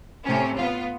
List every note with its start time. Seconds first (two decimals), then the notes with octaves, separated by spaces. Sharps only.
0.25 A2 C3 C#4
0.58 B3 F4